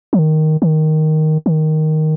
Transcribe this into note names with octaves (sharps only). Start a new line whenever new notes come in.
F3
D#3
D#3
D#3